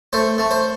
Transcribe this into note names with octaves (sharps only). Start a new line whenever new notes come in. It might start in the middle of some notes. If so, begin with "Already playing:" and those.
A3 C5
A3
C5